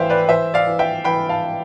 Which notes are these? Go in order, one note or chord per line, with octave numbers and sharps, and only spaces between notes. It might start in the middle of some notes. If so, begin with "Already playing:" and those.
Already playing: A1 E3 C5 E5 F5 G5
B4 D5
E3 C5 E5
D5 F5
E3
E5 G5
E3 G5 B5
F5 A5